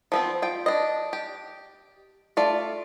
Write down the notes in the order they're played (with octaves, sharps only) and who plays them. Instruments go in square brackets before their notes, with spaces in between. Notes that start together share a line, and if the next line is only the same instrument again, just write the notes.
[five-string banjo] F3 B3 C4
F4 G5
D4 D#5
G4
A3 F4 D5